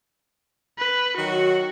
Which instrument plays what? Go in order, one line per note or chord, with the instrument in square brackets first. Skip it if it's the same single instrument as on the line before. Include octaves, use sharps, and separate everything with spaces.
[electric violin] B4
[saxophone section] D#3 F#3 [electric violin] F#4